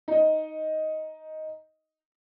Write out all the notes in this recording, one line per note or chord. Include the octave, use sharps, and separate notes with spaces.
D#4 D#5